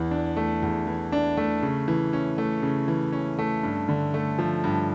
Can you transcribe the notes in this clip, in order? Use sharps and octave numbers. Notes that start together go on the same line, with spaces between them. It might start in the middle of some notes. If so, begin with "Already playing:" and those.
Already playing: E2 E3
D4
A3
E2
E3
D4
A3
C#3
E3
C#4
A3
C#3
E3
C#4
A3
G2
D3
A3
F3
G2